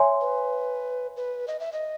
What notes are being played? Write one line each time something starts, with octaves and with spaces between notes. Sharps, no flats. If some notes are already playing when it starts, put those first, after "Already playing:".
Already playing: C#5 E5 G#5 C6
B4
B4
D#5
E5
D#5